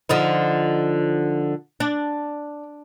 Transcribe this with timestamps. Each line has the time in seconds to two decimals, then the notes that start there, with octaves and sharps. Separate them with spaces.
0.09 D3 F3 D#4
1.80 D4